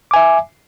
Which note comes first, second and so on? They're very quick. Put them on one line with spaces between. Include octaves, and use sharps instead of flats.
D6 G#5 E5